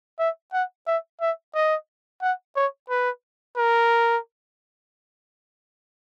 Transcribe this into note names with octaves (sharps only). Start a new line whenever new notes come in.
E5
F#5
E5
E5
D#5
F#5
C#5
B4
A#4